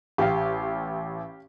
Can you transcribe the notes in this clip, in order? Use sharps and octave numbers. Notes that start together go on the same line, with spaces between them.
A1 G4 F5